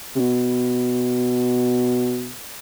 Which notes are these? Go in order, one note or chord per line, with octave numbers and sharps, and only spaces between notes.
C3
B2